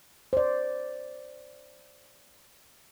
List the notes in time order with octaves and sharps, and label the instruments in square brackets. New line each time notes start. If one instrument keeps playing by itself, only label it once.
[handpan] C5 D5